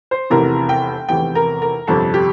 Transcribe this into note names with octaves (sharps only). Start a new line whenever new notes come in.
C5
F1 E2 C3 E3 A#4
G5
F1 E2 C3 E3 G5
A#4
A#4
G1 F2 C3 A4
G4